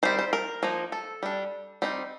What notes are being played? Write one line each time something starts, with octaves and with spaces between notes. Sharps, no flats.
D#3 G3 C4 C5
C5
A#4
F3 A#3 D#4
A4
G3 D4
G3 C4 D#4